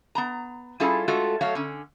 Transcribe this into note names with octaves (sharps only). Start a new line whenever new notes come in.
B3 A#5
G3 C#4 E4 F4 G#4 A4
G#3 A3 F4 F#4 A4
F#3 A3 C#5 F5
D3 C#4